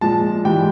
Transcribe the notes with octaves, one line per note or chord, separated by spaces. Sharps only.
A#2 F3 G#3 A5
G#2 E3 G3 G5